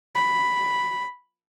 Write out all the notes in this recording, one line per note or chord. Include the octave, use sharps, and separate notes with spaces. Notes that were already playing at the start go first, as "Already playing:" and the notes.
B5